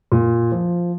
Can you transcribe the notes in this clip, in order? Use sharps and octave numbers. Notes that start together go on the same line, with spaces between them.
A#2
F3